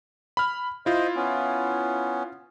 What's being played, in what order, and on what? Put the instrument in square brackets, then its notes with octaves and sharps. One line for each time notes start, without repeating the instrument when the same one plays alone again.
[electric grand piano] B5 F6
[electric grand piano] E4 F4 [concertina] C5 D#5
[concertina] B3 C#4